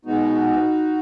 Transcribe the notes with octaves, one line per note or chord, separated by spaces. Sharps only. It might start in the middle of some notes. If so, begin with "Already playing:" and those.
B2 G#3 B3 D#4 F#4